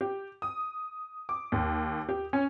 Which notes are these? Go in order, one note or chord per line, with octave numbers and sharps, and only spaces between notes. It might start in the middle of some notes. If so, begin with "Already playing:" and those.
G4
D#6
D6
D#2
G4
C#4